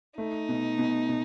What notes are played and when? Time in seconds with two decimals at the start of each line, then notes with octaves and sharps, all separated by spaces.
0.18 A3 D#4
0.49 B2
0.78 B2
1.09 B2